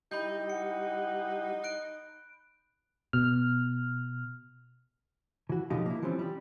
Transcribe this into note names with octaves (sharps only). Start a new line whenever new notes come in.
G3 D#4 E4 G4 B5 G6
F#5 C#7
F#6 D7
B2 F6
E3 F#4
B2 D3 F3 F#3 D#4 G4
A#3 E4
E3 F3 G3 C4 C#4
G3 G4